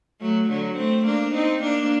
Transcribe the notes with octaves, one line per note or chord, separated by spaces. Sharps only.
F#3 A3
D3 F#3
A3 C4
A#3 D4
C4 D#4
A#3 D4